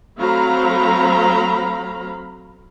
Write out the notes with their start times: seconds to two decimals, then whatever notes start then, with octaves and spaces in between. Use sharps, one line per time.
0.18 F#3 A3 C4 F5 A#5 B5